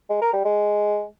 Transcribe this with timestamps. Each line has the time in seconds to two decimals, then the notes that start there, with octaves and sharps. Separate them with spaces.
0.10 G#3
0.21 A#4
0.33 G3
0.45 G#3